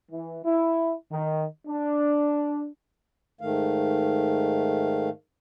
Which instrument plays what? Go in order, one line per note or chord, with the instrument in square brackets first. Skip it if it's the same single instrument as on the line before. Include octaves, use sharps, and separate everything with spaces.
[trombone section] E3
E4
D#3
D4
[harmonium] G#2 D#3 A3 F5